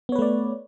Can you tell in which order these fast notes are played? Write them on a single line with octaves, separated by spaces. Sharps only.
B3 C#5 B4 A3 D5